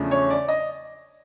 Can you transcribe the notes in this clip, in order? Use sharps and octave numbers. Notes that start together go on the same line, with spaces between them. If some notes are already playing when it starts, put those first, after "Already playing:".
Already playing: E2 C#3 F3 A3 D4
C#5
D5
D#5